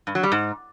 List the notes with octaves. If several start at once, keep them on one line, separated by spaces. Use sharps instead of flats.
G2
F#3
G3
G#2